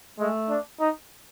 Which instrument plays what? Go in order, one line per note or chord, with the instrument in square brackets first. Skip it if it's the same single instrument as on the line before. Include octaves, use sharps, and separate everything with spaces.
[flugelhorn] G#3 [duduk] A3
[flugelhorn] D4
D#4